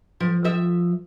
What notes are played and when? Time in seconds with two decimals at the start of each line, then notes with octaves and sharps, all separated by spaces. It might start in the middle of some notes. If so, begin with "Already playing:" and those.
0.20 F3
0.44 F3 E5